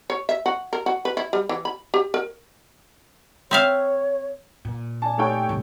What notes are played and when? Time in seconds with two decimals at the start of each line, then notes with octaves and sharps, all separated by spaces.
0.10 C#5
0.29 E5
0.46 F#4
0.73 A#4
0.86 F#4
1.05 B4
1.17 E4
1.33 G3
1.49 E3
1.65 B5
1.94 G4
2.14 A#4
3.51 C4 C#5 E5 F5
4.65 A#2
5.02 D5 G#5 A5
5.18 A3 D#4 G4 A4 C#5 G5
5.49 C2 A2